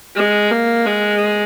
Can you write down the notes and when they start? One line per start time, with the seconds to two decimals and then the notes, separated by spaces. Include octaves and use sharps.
0.16 G#3
0.51 A#3
0.86 G#3